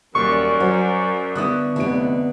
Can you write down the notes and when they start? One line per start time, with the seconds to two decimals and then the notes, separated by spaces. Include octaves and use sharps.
0.15 D#1 F#2 D5 C#6
0.60 F#3 F#4 C5
1.35 D3 B3 E4 D#6 E6 F#6
1.76 F1 D3 B3 E4 D7